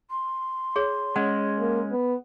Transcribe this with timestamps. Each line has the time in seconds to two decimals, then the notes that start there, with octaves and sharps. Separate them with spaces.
0.11 C6
0.76 G#4 C#5
1.16 G#3 C#4 F#5
1.59 A#3
1.91 B3